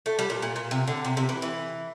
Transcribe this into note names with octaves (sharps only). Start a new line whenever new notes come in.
A3
G3
A#2
A#2
A#2
C3
D3
C3
C3
E3
E3